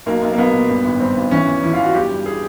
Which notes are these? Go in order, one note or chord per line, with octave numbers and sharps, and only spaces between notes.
B1 A#3
B1
A#3
B1 B3
A#2
G2
G#1
G2 C4
G#1
E3 C#4
E2
E2 E4
F4
E2
F#4
G1 G4
G2
G#4